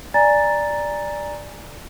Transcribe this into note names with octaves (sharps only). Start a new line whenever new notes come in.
D5 G#5 A#5 A6